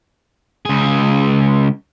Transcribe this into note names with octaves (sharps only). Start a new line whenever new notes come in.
C#2 G#4